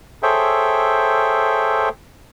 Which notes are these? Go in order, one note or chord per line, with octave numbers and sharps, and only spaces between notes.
G#4 A4 C5 C#5 E5 G5